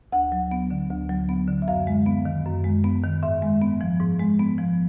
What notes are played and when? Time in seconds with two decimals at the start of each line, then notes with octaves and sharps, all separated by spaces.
0.12 D2 F#5
0.32 F#3
0.52 B3
0.71 D3
0.90 D2
1.10 F#3
1.29 B3
1.48 D3
1.62 E5
1.68 F#2 F5
1.87 G#3
2.06 B3
2.25 D#3
2.45 F#2
2.64 G#3
2.84 B3
3.03 D#3
3.23 G#2 E5
3.42 G#3
3.62 B3
3.81 F3
4.00 G#2
4.20 G#3
4.39 B3
4.58 F3